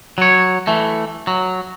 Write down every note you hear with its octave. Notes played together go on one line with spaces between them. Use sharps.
F#3 C#5
E3 A3
F#3